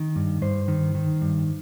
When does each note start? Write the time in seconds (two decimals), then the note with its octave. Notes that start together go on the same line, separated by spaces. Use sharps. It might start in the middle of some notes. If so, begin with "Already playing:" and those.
Already playing: D#3
0.16 G2
0.42 G2 C5
0.68 D#3
0.95 D#3
1.21 G2